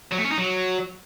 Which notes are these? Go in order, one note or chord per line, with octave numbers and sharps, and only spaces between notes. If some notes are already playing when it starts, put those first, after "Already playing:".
F#3
A3
C#4
D#4
F#3